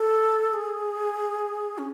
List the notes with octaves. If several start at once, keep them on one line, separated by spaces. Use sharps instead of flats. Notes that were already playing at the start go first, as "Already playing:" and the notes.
Already playing: A4
G#4
C#4